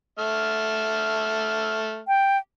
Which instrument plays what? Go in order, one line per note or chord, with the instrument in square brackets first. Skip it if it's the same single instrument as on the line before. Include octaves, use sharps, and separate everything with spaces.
[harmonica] A3 E5 F6
[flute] G5